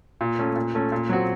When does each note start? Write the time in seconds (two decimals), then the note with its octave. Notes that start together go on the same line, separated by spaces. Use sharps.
0.21 A#2
0.39 A3 C#4
0.56 A#2
0.75 A3 C#4
0.92 A#2
1.09 F#3 C4 F#4